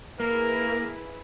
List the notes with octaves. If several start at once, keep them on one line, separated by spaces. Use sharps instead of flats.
A#3 E4 G#4 A#4 B4